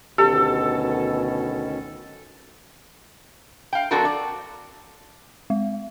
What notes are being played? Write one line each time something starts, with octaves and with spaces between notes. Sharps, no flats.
D2 B2 D#3 C#4 G4 A4
F5 G5
F2 C4 D4 F#4 A4 A#4
D5
G#3